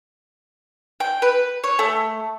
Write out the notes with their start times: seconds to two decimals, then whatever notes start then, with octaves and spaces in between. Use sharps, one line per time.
1.00 G5
1.22 B4
1.64 C#5
1.79 A3